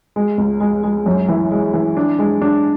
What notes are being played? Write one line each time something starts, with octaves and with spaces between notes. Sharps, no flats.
G#3
C#2
G#3
G#3
F#2
E3
G#3
E3
D4
G#3
D4